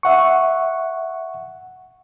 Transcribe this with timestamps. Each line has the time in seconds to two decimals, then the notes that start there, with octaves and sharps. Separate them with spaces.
0.03 E5 F#5 C#6